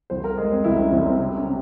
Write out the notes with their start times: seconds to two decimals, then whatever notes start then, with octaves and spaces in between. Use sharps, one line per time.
0.10 C2 C5
0.24 A#4
0.37 G#3 G#4
0.51 C4
0.64 C2 E4
0.79 C#4
0.92 C2 C4
1.06 C4
1.19 C3 C4
1.37 C#4
1.46 C3